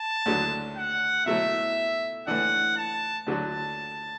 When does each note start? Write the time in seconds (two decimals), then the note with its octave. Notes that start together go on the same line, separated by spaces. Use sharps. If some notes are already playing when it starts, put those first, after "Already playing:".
Already playing: A5
0.26 D2 D3 F#3
0.76 F#5
1.26 B2 F#3 A3 E4 E5
2.27 A2 E3 D4 F#5
2.77 A5
3.27 D2 D3 F#3 D4 F#4 A5